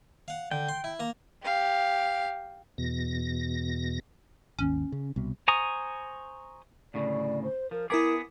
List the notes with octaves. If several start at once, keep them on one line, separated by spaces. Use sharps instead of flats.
F5 F#5
D3 G5
C6
E4
A#3 A#5
G4 F5
E2 B2 A#6
G#1 D#2 C#4
C#3
C2 B2
C5 G#5 A#5 C#6 D#6
D2 A2 C#3 D5
C5
F3 A#4
B3 E4 G#4 A#4 D6 D#6